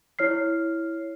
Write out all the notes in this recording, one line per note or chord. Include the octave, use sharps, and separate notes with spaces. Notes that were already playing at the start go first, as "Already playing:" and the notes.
E4 C#5 F6 C7